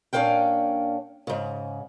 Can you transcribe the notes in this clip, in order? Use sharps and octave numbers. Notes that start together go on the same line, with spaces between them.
A#2 C#4 D4 C5 F5 G5
G#2 C#3